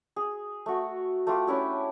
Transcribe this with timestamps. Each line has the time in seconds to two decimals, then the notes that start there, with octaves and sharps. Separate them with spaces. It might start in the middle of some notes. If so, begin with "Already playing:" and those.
0.16 G#4
0.66 A3 F#4
1.27 A3 F4 G4
1.47 C#4 D4 E4 G4